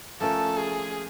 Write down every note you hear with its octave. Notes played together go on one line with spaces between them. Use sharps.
F3 A3 C#4 F4 A4 A#4
G#4